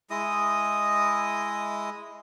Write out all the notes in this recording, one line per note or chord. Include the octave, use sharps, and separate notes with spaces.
G#3 E4 D#5 D#6